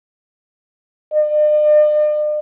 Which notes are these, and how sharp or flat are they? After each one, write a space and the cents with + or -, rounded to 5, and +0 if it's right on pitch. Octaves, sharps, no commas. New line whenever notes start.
D5 +45